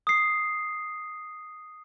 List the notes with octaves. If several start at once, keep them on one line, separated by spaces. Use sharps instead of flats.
D#6 C7